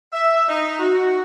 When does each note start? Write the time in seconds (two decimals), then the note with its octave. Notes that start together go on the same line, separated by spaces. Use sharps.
0.13 E5
0.49 D#4
0.80 F#4